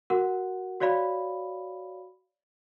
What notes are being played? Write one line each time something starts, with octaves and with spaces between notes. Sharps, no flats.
F#4 A#4 F#5
F#4 C#5 D5 F5 B5